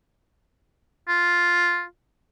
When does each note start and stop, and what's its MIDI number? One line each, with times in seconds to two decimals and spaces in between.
1.09 1.84 65